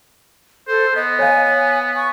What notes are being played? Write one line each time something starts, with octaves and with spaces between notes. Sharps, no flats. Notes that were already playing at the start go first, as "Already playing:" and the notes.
A4 C5
B3 D#5
C#5 F5 G#5
G#5
C#6